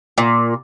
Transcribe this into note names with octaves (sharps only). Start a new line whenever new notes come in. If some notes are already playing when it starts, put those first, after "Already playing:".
A#2